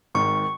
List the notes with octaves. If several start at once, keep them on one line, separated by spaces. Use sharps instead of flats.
G#1 G#2 D#3 C#6